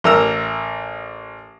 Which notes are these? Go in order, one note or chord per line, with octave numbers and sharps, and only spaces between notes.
A1 A#4 E6